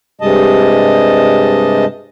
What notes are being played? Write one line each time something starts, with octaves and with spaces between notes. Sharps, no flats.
G2 C3 G3 G#3 D#5 A5